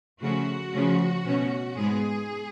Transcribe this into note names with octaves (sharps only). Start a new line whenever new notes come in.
C#3 F3 A3 C#4 F#4
C#3 F3 A3 C#4
B2 A3 C#4
G#2 G#3 B3 G#4